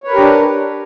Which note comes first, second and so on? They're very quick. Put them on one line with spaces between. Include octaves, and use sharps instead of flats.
C#5 B4 A#4 G4 D4